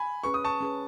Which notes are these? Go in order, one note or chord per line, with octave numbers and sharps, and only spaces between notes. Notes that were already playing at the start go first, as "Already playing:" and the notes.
Already playing: G#5 B5
C#4 G#4 B4 C#6
D#6
A5 C#6
C#4 G#4 B4